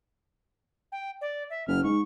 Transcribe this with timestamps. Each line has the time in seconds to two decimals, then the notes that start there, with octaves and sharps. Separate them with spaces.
0.92 G5
1.21 D5
1.50 E5
1.68 F#1 F6
1.84 G#2 C#6